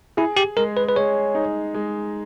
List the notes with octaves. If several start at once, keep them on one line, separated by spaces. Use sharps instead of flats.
E4 G#4
G4
G#3 A#4
B4
B4
G#3 C#5
D#4
G#3